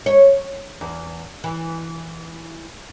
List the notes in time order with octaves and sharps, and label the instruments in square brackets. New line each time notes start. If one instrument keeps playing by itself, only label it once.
[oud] C#5
E2
E3